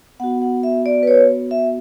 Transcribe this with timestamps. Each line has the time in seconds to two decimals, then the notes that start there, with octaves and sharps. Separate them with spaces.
0.20 B3 F#5
0.24 F#4
0.42 F#5
0.63 E5
0.86 D5
1.03 B4
1.07 C#5
1.51 E5